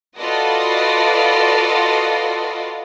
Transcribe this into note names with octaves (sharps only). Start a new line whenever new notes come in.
F4 F#4 A4 B4 D5 D#5